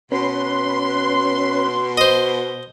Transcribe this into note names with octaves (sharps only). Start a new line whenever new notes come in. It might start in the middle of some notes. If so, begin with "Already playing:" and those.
B2 C#4 B4 C6
C5 D#5